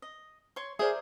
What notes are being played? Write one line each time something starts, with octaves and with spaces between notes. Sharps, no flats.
D#5
C#5 C6
G#4 A#4 C5 D5 E5 D#6